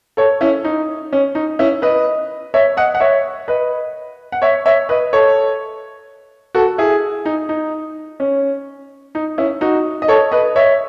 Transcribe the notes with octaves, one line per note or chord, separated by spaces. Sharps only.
A4 C#5
C#4 E4
D#4
C#4
D#4
C#4 E4
B4 D#5
C#5 E5
D#5 F#5
F#5
C#5 E5
B4 D#5
F#5
C#5 E5
C#5 E5
B4 D#5
A4 C#5
F#4 A4
E4 G#4
D#4
D#4
C#4
D#4
C#4 E4
D#4 F#4
D#5
A4 C#5
B4 D#5
C#5 E5